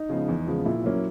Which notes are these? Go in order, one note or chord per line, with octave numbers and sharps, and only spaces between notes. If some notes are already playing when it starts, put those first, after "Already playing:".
Already playing: D#4
C#3 F3 G#3 B3
E2
C#3 F3 G#3 B3
A#2 E4
F#3 A#3 C#4